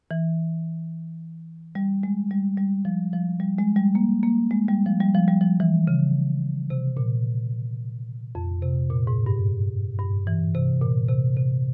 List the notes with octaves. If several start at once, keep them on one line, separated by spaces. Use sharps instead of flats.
E3
G3
G#3
G3
G3
F3
F3
G3
G#3
G3
A#3
A#3
G#3
G3
F3
G3
F3
G3
F3
E3
C#3
C3
A#2
F2
C3
A#2
G#2
G2
G2
E3
C3
A#2
C3
C3